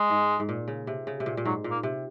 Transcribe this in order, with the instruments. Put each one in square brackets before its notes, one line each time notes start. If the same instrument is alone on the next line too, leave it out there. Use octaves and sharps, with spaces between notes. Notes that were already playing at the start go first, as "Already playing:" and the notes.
Already playing: [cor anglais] G#3
[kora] G#2
G#2
A#2
C#3
C3
C#3
C3
A#2
A#2
[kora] G#2 [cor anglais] F#3
[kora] A#2
[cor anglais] A#3
[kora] C3